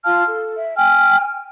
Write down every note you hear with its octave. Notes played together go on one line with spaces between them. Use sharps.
F4 F5 A5 F6
A4
E5
G5 G#5 F6